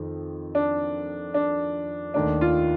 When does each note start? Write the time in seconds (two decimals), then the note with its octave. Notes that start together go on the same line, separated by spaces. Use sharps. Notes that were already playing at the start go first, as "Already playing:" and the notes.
Already playing: F2 D#3
0.55 D4
1.34 D4
2.14 D#2 D#3 A3 D4
2.41 F4